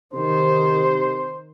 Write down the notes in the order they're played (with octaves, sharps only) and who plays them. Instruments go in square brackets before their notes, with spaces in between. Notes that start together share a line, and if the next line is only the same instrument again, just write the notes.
[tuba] C3 [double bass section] D#3 [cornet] C5